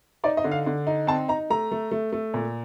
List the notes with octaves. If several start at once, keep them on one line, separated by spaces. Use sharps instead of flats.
D#4 D5
D#5
D3
F5
D3
D#4
C4 A5
D#4 A#5
A3 A#5
A3
A3
A3
A#2